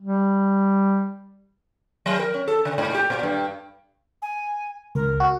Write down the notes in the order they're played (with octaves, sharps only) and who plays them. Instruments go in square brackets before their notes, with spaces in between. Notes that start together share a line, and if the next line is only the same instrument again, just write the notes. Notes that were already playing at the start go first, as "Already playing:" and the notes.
[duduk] G3
[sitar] F#3
A#4
C#4
A4
C#3
G#2
G4
A#2
G2
[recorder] G#5
[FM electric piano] C#2 [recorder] A#4
[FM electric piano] F#4